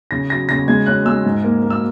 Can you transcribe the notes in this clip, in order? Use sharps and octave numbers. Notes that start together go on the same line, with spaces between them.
C#3 A#6
F#3 A#6
C#3 A#6
G#3 G#6
C#4 F#6
G#3 E6
G#2
A#3
A#3
E6